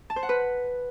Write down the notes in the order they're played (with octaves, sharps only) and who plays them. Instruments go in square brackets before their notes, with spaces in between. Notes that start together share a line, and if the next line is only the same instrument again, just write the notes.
[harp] A5
C5
F#5
B4